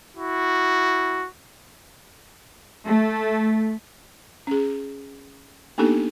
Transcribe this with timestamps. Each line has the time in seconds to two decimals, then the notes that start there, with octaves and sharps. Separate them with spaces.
0.17 E4 F#4
2.85 A3
4.47 C#4 G#4
5.78 A#3 B3 D4 D#4 G4 A4